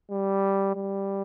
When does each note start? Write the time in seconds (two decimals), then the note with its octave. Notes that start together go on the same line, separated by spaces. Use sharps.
0.11 G3
0.75 G3